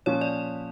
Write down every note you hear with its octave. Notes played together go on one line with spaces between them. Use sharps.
A#2 F3 C#4 C#5
D5